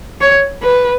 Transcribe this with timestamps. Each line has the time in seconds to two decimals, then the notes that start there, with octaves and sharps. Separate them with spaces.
0.21 C#5
0.63 B4